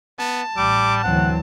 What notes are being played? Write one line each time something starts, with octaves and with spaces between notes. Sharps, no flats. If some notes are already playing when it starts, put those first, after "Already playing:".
B3 A5
A1 G3 D6
D2 E3 F#3 C4 F#5